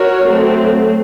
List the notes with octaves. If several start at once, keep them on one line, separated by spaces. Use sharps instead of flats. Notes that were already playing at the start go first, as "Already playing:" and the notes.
Already playing: F#4 A#4 C#5
F#3 A3 C4